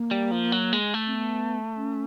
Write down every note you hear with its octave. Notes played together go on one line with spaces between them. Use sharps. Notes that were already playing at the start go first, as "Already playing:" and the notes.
Already playing: A#3
G3
F3
F#3
G#3
A3
C4
B3
C#4